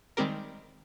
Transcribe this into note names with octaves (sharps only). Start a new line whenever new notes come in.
D#3 G3 G#3 C4 G4 A#4